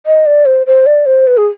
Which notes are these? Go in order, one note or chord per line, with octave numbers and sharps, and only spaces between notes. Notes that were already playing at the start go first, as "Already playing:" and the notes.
D#5
D5
C5
C5
D5
C5
B4
G#4